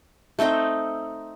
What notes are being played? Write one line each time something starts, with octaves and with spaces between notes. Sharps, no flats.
A3 C4 D#4 G5